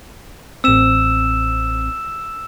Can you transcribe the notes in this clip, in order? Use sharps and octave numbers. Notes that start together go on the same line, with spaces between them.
A1 C4 E6 E7